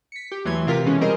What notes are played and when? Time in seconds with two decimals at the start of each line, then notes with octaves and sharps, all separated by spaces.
0.12 B6 C#7
0.32 G4
0.45 E2 E3 F#3 A3 C6 G#6
0.67 C3 C4 F4 A#4 B6
0.84 B2 E3 G#3 C#4
1.01 G3 C4 G#4 A#4 C5 D#5